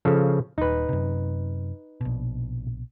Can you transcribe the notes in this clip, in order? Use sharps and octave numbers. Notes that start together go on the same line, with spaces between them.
C#3 F3 A4
D#1 D#4 B4
F#2 C3
A#1 B2